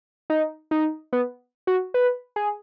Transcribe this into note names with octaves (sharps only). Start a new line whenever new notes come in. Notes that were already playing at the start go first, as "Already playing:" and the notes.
D#4
D#4
B3
F#4
B4
G#4